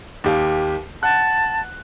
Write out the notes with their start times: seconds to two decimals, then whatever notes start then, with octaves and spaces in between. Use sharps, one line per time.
0.24 D#2 G4 F5
1.03 F#5 A5 F#6